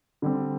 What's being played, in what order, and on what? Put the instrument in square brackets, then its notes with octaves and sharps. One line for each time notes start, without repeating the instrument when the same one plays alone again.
[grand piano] D3 G3 C4